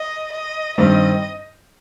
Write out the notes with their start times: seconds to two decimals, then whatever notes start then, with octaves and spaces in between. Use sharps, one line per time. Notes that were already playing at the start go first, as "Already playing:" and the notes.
Already playing: D#5
0.32 D#5
0.78 G2 D#3 G3 C4 G4 D#5